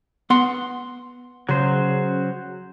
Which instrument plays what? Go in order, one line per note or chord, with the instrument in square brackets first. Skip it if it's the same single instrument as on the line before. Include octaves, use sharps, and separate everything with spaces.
[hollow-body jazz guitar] B3 F#5 C6
[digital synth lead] C#3 [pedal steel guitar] F#3 C5